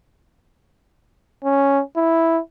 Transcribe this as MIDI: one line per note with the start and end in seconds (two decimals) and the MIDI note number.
1.44 1.81 61
1.96 2.39 64